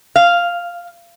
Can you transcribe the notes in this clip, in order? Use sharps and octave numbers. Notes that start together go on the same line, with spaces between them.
F5